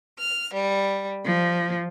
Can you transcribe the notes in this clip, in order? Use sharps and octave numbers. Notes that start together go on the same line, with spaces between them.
F6
G3
F3